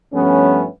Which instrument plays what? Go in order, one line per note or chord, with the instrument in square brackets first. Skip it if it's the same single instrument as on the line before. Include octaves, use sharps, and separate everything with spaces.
[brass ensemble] G2 F3 A3 B3 C#4